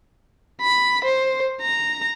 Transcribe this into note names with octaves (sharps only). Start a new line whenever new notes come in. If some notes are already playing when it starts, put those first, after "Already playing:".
B5
C5
A#5